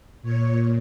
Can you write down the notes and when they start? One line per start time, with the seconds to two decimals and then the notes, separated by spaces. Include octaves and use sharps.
0.22 A#2 C#5